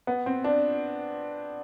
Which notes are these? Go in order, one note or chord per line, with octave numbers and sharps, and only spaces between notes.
B3
C4
D4